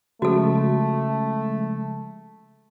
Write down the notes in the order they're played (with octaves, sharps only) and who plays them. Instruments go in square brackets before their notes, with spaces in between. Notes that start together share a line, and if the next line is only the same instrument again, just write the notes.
[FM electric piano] C#3 F3 G#3 [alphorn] A3 [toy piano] F#4 A4